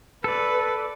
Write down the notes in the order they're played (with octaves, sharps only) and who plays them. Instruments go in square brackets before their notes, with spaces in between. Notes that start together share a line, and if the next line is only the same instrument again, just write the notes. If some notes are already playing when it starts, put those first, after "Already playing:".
[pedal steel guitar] A4 D5 [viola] B4